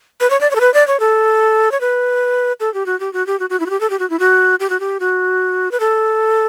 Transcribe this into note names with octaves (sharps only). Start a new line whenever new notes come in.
B4
C#5
D5
C#5
A4
B4
D5
C#5
A4
C#5
B4
A4
G4
F#4
G4
F#4
G4
F#4
F#4
E4
F#4
G4
A4
G4
F#4
E4
F#4
G4
F#4
G4
F#4
B4
A4